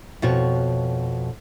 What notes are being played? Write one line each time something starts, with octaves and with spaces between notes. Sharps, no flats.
F2 B2 F#4 C#5